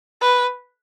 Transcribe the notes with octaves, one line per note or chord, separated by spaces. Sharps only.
B4